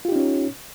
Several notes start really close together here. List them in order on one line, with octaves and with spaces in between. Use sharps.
F4 G4 D#4 C#4 C#5